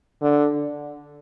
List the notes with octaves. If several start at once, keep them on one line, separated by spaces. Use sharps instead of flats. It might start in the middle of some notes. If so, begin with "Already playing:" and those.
D3